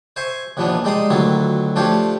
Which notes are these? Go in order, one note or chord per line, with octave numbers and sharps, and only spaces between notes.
C5 E5 G#5 C6 C#6
D#2 A#2 E3 F3 B3 D4
G3 G#3 D#4 D5 C6 D#6
D2 D#3 F#3 E4 F4
F3 A3 D4 F4 G4 C#5